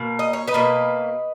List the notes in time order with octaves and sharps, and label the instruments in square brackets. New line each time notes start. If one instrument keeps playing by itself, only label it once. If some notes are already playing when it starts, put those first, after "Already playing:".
Already playing: [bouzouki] B2 A#3
D#5
C#5
B4 D#5
B2 A#3